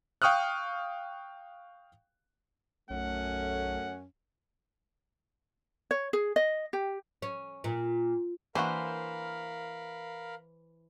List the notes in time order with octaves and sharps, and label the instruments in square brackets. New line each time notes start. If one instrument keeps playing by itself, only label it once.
[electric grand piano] F5 G5 C#6 D#6 F6 F#6
[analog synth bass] B1 [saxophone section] F#2 C#4 [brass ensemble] A3 [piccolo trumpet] F#5
[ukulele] C#5
G#4
D#5
G4
[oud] C#4
A#2
[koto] E3 C5 [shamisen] A#3 D4 F#4 [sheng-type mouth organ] A#4 F5 B5